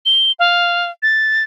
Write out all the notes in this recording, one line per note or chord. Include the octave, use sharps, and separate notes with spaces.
G7
F5
A6